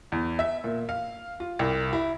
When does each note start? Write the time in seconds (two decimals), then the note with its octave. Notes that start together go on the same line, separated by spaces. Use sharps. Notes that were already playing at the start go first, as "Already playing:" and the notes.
0.12 E2
0.39 E5
0.64 A#2
0.89 F5
1.40 F4
1.59 C2
1.93 E4